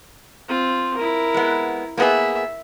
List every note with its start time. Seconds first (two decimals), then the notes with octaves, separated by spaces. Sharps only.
0.48 C4 F4
0.96 E4 A#4
1.34 G#3 B3
1.97 A#3 B3 G#4 E5